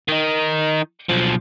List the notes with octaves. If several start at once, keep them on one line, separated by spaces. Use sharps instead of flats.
D#3 D#4
B1 F3